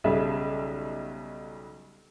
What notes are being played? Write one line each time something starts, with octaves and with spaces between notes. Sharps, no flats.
B1 C#3 G3 E5